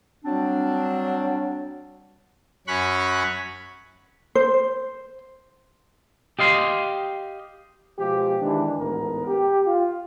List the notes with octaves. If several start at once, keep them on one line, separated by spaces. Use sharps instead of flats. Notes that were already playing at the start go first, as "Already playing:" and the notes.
F#3 G3 C4 D4
F#2 C#4 B5 C#6 F#6
C5
G4 D#5 F5 C6
B2 F3 G#3 G4
D#3 E3 G#3 D4
A1 D2 G#2 B3 A#4
G4
F4